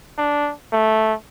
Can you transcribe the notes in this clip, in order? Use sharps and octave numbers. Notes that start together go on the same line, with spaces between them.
D4
A3